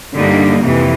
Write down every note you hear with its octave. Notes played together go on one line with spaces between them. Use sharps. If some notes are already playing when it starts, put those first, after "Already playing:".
G2 D3 G3 A#3 D#4
F2 C3 E3